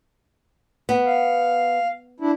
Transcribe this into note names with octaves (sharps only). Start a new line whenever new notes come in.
B3
F5
D4 E4